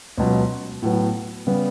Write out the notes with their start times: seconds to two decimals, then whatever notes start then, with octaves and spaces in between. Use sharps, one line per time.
0.18 C#2 B2 F#3
0.82 A2 F#3 B3
1.47 C#3 G3 B3